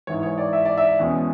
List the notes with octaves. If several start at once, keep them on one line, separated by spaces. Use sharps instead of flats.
G#2 E3 G#3 C#5
C#5
D5
E5
D5
E5
E2 B2 G#3 C#4